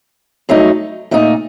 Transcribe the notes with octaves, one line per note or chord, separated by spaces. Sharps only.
G2 F#3 A3 D#4
A#2 A3 D#4